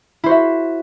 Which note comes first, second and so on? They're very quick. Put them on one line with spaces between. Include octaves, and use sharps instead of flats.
E4 C5 F#4 E5